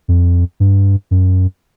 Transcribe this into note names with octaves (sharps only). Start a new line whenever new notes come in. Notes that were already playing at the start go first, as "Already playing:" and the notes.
F2
G2
F#2